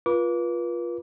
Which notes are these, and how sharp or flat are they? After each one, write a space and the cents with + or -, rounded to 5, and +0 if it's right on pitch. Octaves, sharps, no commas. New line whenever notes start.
F4 +0 B4 -35 D6 -25